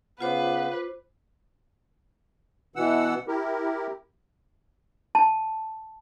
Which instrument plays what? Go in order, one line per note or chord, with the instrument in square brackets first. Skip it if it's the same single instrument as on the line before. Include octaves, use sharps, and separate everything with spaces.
[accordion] C#3 B3 [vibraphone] F4 C5 D6 [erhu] B4
[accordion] B2 E3 F#5 E6
E4 G4 A#4
[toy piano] A5